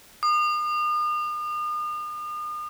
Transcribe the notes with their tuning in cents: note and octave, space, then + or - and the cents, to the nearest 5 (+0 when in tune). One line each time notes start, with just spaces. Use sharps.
D#6 -40